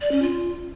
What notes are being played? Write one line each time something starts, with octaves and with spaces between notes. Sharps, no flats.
D5
C#4
F4